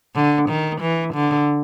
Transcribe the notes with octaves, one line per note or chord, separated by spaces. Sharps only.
D3
D#3
E3
D3